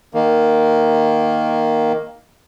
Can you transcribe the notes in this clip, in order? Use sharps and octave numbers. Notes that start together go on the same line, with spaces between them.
D#3 A#3